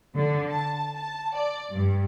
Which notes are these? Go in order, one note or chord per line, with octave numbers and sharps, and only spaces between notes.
D3
A5
A5
D5
G2